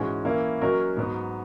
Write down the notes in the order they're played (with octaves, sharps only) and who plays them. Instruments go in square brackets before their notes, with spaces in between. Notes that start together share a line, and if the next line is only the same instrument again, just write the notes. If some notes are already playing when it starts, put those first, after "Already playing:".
Already playing: [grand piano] G#2 E3 G#3 C#4 F#4
E3 A#3 C#4 E4
F#3 C#4 F#4 A#4 D#5
G#2 F#3 B3